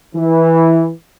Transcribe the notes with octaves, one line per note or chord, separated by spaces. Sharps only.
E3